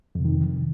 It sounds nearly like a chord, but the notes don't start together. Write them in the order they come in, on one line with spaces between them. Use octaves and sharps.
F2 C3 D#3